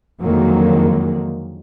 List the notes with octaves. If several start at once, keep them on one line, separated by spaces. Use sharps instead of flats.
F2 D3 D#3 F#3 G#3 A#3